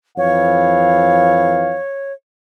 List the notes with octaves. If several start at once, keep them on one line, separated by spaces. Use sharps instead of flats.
F2 E3 C#5 F5